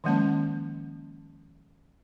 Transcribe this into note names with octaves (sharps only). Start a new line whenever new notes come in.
D#3 F3 G#3 A#3 C#4 A5